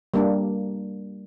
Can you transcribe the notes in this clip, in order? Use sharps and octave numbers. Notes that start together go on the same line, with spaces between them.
G3 A#3 D4